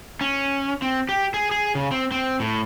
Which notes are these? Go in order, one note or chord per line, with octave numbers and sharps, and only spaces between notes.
C#4
C4
G4
G#4
G#4
C#3
C4
C4
A2